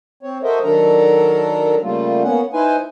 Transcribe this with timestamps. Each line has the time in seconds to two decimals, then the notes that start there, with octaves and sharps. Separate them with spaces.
0.23 C4 C#5
0.43 F#4 A4 A#4 C5 D#5 E5
0.64 D#3 F#3 D4 A4 A#4 A#5
1.83 C#3 G3 A3 A#3 F4
2.23 A#3 B3 C#4 F#5
2.53 D#4 E4 B4 C5 G#5